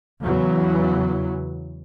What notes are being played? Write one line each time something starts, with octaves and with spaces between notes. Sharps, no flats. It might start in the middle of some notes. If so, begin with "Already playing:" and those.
E2 C#3 E3 F#3